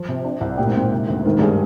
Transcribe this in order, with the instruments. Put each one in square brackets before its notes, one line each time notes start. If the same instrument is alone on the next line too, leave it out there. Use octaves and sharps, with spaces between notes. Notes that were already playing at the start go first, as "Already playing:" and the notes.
Already playing: [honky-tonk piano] F3
C3
D4
C2
[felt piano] A#2 [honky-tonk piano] G4
[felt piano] G#2
[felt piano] A#2 [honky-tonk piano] C4
[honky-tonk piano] C3
D2
[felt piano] G#2 [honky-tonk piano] D#3
[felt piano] G2 [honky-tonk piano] G#4